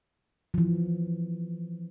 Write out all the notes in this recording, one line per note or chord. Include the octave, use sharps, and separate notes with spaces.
F3
E3